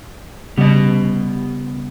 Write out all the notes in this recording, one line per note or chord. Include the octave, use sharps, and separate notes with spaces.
C#3 G3 B3 D#5